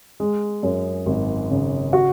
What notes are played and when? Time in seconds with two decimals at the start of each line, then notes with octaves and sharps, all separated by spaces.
0.20 G#3
0.63 F#2
1.06 G#1
1.51 C#3
1.93 F#4